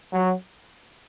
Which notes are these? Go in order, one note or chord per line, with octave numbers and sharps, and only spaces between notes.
F#3